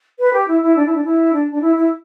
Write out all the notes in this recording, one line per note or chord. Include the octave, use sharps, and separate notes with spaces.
B4
G4
E4
E4
D4
E4
D4
E4
D4
D4
E4
E4